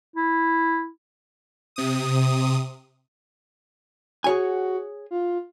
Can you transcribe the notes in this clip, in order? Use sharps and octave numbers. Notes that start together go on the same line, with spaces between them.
E4
C3 D#6
F#4 G#4 C#5 G#5
F4